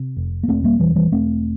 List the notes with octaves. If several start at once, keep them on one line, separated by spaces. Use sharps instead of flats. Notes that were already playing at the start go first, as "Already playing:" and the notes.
Already playing: C3
F1
A#3
E1 A3 C4
G3 A#3
E1 E3 G3
E3 G3
E1 A3 C4